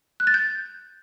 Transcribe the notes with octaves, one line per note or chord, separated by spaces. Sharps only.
F#6
A6
G6